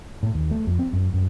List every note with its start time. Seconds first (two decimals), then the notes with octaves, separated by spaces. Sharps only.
0.23 A2
0.34 D#2
0.51 A3
0.67 F2
0.79 C4
0.93 F#2
1.14 F#2